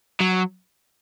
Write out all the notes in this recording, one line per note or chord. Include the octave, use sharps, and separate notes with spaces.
F#3